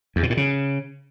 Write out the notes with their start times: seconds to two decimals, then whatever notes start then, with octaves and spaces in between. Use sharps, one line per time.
0.16 E2
0.23 B2
0.30 A2
0.37 C#3